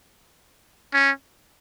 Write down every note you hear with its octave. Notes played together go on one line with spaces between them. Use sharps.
C#4